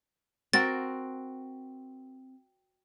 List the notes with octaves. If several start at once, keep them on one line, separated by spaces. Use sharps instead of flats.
C4 F#4 A#4 A6